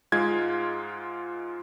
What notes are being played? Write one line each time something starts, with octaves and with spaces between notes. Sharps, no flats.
G#2 G#3 F4 G#6